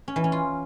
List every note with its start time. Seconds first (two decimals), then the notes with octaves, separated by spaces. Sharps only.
0.08 C#4
0.16 E3
0.24 C#4
0.32 F4